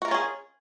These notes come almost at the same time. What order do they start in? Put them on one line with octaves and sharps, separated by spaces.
F#4 A#4 F4 C#4 G#4